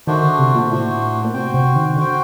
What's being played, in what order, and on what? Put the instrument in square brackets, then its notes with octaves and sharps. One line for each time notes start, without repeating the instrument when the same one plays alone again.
[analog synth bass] D#3 [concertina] A3 D4 F#4 C5
[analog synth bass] D3
C3
A#2
[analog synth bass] A2 [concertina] A3 D4 F#4 C5
[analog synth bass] A#2
[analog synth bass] C3 [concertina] F#4 C5 G5
[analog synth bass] C3
D#3
[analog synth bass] D3 [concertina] F#4 C5 G5